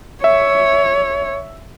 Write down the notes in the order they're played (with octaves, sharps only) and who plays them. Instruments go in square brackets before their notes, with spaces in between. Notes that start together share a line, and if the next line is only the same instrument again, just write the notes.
[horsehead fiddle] C#5 [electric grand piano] E5